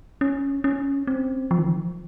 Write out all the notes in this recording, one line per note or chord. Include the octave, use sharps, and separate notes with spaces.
C#4
C#4
C4
F3
D#3
F3